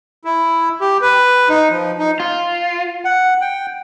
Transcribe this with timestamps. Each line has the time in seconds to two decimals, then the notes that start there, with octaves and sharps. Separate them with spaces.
0.25 E4
0.81 G4
1.02 B4
1.49 D#4
1.70 F3
1.99 D#4
2.20 F4
3.05 F#5
3.41 G5